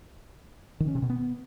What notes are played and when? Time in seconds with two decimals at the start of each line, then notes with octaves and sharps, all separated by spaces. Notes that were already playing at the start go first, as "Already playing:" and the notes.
0.80 D#3
0.88 C#4
0.95 C3
1.02 B2
1.10 B3